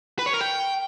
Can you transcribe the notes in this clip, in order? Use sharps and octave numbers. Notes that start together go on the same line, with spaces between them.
B4
C#5
A#4
G5